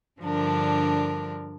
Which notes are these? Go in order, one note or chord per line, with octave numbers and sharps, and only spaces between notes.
G2 D3 F3 D4 A#4